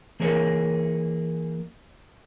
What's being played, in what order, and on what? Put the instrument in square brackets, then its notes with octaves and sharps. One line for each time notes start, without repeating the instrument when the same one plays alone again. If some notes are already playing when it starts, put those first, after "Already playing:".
[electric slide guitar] E3 A#3 G#4 A#4 C#5